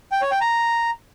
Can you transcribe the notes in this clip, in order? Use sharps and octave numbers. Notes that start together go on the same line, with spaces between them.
G5
C#5
G5
A#5